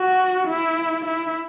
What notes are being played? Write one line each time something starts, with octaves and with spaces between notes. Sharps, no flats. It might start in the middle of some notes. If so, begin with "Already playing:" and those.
Already playing: F#4
E4
E4